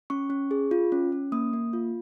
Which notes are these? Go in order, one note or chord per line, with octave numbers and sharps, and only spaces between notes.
C#4 C#6
C#4
G#4
F4
C#4
C#4
A#3 D#6
A#3
F4